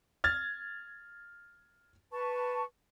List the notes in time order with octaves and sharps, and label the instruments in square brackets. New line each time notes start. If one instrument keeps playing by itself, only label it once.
[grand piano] F6 G#6 A6
[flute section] B4 A5 C#6